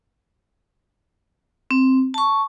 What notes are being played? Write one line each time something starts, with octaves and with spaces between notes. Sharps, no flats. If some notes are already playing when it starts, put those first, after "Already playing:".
C4
A5 C#6